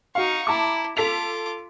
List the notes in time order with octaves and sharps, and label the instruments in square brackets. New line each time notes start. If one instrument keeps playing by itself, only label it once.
[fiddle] D#4 C#6 [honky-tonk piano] F#4 F5
[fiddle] E4 [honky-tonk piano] A5 A#5 D6
[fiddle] F4 D6 [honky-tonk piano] A4 B6 F7